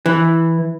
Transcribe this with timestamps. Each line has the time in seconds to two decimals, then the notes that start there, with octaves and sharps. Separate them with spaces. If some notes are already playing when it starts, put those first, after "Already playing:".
0.06 E3